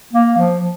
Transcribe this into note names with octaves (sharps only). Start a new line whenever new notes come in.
A#3
F3